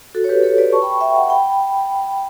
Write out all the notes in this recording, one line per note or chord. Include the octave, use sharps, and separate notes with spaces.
F#4 A4
C#5
G4 B4
A4 C#5
B4 D5
A5 C#6
G5 B5
E5 G5
F#5 A5
G5 B5